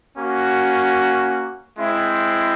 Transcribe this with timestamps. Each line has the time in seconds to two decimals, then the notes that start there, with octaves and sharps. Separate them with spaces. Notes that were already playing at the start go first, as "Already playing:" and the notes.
0.17 A#3 C#4 F#4
1.78 G#3 C4 E4